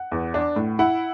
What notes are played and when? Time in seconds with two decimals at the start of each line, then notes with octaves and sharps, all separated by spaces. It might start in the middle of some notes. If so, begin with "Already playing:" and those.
Already playing: F#5
0.12 E2
0.34 D4
0.56 A2
0.79 E4 F#5